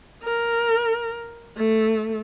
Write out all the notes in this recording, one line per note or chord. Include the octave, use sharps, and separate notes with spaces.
A#4
A3